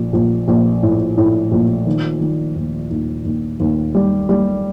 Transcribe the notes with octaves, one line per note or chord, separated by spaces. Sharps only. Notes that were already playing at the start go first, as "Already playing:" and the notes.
Already playing: A#1
A#1
A#1
A2
A2
A#1
D#3
D#3
D#2
D#2
D#2
D#2
G3
G3